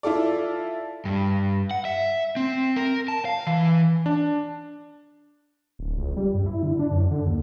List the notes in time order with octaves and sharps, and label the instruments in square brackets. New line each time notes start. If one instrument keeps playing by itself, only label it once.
[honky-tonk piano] E4 F4 A4 D5
[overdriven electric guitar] G2
F#5
E5
C4
A#4
A5
F5
E3
[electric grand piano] D4
[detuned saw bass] D1
C#2
G3
G2
E4
D3
D4
F#2
D3
D#2